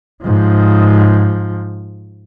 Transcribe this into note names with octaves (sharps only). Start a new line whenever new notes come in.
G#2 F3